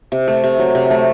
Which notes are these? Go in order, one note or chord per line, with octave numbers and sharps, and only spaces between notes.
C3
A3
C3
F#3
C3
A3